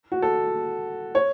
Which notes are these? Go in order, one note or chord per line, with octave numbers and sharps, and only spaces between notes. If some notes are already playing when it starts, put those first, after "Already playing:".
F#4
A4
C#5